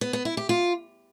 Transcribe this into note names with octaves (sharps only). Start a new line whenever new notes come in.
B3
B3
E4
G4
F4